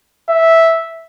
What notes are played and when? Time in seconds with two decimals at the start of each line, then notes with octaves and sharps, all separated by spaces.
0.29 E5